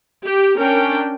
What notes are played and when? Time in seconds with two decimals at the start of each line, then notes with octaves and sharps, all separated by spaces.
0.24 G4
0.56 C#4 D4 A#4 G5